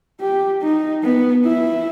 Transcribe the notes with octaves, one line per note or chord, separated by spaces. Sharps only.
G4
D#4
B3
E4